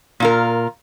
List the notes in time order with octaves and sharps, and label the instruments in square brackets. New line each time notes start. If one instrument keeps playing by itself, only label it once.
[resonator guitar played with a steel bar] A#2 F4 A#4